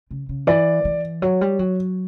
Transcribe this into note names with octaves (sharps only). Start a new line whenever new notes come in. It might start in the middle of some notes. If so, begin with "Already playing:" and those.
C#3
C#3
E3 D5
E3
F#3 C#5
G3
F#3